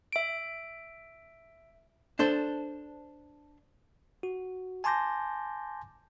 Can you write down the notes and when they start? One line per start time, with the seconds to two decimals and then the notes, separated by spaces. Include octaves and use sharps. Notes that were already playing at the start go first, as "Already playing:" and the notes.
0.13 E5 D7
2.19 D4 A4 C5
4.23 F#4
4.84 G#5 A5 C6 D6 G6 A#6